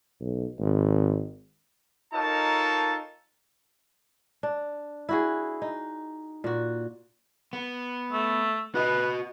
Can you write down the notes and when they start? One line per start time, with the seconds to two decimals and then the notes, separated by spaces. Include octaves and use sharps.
0.20 B1
0.59 G#1
2.13 D#4 F4 A4 A#4 C#5 A5
4.43 D4
5.09 E4 F#4 G#4
5.62 D#4
6.44 A#2 F#4
7.53 B3
8.13 A3
8.75 F#4 B4 D#5